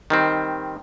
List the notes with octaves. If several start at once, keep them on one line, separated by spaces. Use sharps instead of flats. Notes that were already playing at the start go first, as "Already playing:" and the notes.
D#3 G3 C4